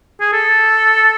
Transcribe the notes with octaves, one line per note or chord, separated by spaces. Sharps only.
G#4
A4